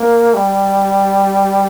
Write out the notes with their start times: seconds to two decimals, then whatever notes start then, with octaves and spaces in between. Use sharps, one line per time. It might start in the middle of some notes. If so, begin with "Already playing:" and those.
Already playing: A#3
0.34 G3